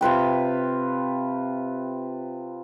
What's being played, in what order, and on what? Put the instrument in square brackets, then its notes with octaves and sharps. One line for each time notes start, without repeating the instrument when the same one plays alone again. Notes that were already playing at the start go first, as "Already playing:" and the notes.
[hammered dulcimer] C3 F4 B4 G5